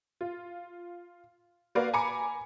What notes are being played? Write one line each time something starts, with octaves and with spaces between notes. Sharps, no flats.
F4
A#3 F#4 A#4 B4 D5 F5
G#5 A#5 B5 D6 C#7